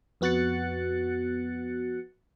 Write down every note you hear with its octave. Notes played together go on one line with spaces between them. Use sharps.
F2 B3 F#4 F#6 A6 C#7